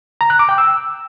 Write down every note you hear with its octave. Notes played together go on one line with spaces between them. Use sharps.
A#5
F#6
D6
G5
E6